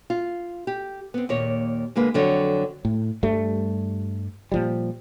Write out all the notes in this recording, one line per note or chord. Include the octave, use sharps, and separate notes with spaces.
F4
G4
B3 C4
D#2 A#2 C#5
D3 G#3 A#3 B4
F2 D3 F#3 C#5
A2
G2 G3 A3
A#2 F3 G3